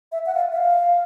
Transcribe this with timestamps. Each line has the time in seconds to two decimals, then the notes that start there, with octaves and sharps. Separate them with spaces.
0.12 E5
0.26 F#5
0.35 F5
0.52 E5
0.57 F5